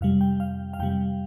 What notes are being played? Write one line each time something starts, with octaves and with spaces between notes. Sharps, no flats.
F2 C3 G3 F5
G5
F5
F5
F2 C3 G3 G5